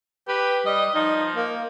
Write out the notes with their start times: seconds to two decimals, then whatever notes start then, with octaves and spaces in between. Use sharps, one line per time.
0.28 G4 B4
0.66 G3 D#5
0.95 F3 D#4
1.36 A#3